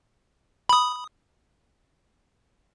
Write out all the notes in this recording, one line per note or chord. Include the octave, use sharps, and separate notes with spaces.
B5 D#6